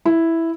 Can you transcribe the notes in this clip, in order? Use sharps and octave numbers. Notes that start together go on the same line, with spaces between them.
E4